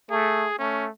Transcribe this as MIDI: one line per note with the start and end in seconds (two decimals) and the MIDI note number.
0.11 0.49 57
0.11 0.54 68
0.59 0.90 57
0.59 0.86 61